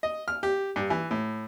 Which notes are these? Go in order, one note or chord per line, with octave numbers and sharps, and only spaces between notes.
D#5
F6
G4
G2
E3
A2